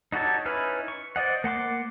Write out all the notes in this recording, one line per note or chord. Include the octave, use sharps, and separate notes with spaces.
D#4 F#4 G4 A4 C#5
C#4 D#4 E4 B4 F6
C#6
C5 D5 D#5 F#5
A#3 F#5 C6 D6